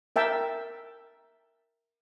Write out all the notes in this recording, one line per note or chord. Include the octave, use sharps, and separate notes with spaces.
A#4 E5 G5 A5